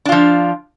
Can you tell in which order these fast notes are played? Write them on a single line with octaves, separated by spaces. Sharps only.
D4 F4 F3